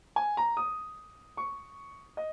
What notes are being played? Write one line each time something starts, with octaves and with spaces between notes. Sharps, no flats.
G#5
A#5
D#6
C#6
D#5